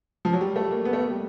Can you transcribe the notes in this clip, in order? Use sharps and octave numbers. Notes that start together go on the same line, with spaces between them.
F3
F#3
G3
A3
A#3
B3
A3
A#3
G3